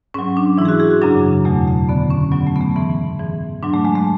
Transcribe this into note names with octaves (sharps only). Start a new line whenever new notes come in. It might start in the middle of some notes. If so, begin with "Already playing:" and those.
G#2 F#3 C#4
D4
G#2 E3 E4 G#4
F#4
G#4
F#4
F#2 C#3 F#3 D4
E2 B2 F#3 A3
A3
F#2 D3 F#3 B3
C#4
G#2 F#3 B3
A3
B3
A3
G#2 E3 B3
G#2 E3
G#2 F#3 D4
A3
G#3
A3